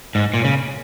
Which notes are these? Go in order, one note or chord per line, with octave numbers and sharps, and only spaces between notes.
G#2
A#2
C#3